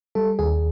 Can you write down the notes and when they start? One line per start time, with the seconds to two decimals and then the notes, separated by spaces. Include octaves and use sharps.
0.15 G3 A4
0.39 D#2 G#4